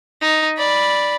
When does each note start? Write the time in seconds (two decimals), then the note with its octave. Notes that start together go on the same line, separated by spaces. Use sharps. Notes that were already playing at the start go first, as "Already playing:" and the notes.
0.22 D#4
0.57 D5 B5